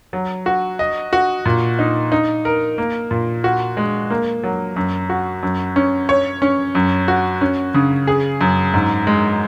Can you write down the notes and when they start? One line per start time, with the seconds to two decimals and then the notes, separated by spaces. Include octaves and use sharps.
0.13 F#3
0.46 F#4
0.79 D#5
1.13 F#4
1.46 A#2
1.79 D#4
2.12 D#4
2.45 A#4
2.78 A#3
3.11 A#2
3.44 F#4
3.77 G#3
4.10 A#3
4.44 F#3
4.76 F#2
5.09 F#4
5.43 F#2
5.76 C#4
6.09 C#5
6.42 C#4
6.75 F#2
7.08 F#4
7.41 C#4
7.74 C#3
8.07 G#4
8.41 F#2
8.74 G#2
9.07 G#3